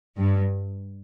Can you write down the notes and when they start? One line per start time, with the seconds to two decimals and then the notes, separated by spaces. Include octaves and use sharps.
0.17 G2